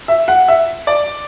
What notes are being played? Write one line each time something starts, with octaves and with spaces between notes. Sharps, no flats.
E5
F#5
E5
D5